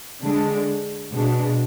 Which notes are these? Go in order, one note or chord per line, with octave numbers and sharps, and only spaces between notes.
D3 G#3 D4
B2 G#3 D4